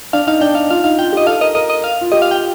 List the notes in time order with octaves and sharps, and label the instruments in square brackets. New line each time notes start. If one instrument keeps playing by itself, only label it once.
[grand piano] D4 [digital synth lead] F5
[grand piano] D#4 [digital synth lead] F5
[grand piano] D4 [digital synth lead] G5
[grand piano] D#4 [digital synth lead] F5
[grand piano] F4 [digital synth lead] F5
[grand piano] D#4 [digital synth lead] F5
[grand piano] F4 [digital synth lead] G5
[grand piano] G4
[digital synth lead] D#5
[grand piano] A4 [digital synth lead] F5
[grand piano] A#4 [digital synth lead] D#5
[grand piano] A#4 [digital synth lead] D#5
[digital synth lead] D#5
F5
[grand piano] F4
[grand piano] G4 [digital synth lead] D#5
[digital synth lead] F5
G5